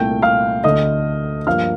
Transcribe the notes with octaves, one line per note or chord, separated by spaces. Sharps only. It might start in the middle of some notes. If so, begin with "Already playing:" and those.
Already playing: C2 A#2 A3 G5 G6
F5 F6
D2 D3 A3 D#5 D#6
G2 F3 A#3 F5 F6